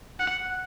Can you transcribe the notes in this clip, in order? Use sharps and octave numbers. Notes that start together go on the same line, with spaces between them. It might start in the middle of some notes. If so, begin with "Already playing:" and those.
F#5